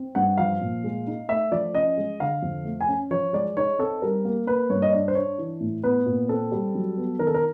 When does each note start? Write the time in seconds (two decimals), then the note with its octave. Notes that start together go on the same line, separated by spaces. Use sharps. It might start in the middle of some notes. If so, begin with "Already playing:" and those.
Already playing: C4
0.15 G2 F#5
0.38 F3 F5
0.61 A#2
0.84 G#3
1.07 D#4
1.29 A3 E5
1.52 F3 D5
1.75 C#4 D#5
1.97 G#3
2.20 D3 F5
2.42 F2
2.65 A3
2.81 G#5
2.88 C#4
3.11 F3 C#5
3.33 G#3 D5
3.57 D#4 C#5
3.79 C4 A4
4.02 G3 A#4
4.25 A#3
4.47 A#3 B4
4.70 G2 C#5
4.82 D#5
4.93 D4 D5
5.08 C5
5.15 D4 C#5
5.38 E3
5.60 A2
5.83 B3 B4
6.06 A#2
6.29 C4 A4
6.52 G3
6.75 F#3
6.97 B3
7.19 D#3 A#4
7.27 A4
7.34 A#4